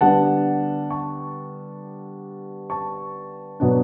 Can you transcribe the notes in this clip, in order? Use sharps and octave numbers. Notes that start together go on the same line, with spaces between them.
D3 G3 B3 D4 F#5 A5
A5 C#6
A5 C#6
B2 F#3 B3 D4